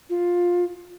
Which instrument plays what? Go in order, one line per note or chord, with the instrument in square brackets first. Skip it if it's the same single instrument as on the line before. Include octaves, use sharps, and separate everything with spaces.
[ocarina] F4